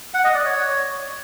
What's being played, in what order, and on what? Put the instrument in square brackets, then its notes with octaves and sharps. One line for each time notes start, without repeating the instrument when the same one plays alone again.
[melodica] F#5
D#5
D5
C#5